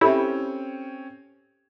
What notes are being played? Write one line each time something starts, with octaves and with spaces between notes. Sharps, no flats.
C4 C#4 E4 G4 A4 C#5